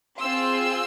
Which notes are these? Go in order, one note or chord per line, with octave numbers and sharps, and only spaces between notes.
C4 F4 G#4 C6 E6